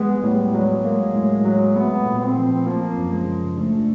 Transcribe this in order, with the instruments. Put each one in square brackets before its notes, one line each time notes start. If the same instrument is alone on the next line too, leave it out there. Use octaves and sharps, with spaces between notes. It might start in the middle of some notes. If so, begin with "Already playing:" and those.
Already playing: [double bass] G#3 [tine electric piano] B3
[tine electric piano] A2 [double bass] G3
[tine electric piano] F#3 [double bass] G#3
[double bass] G#3 [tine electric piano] A#3
[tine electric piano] A2
F#3
[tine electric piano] A3 [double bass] B3
[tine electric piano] A#2
[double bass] C4
[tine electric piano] F3
[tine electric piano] F3 [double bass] A#3
[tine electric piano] F#2
[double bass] G#3
[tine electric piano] C#3
[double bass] A3 [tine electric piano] D4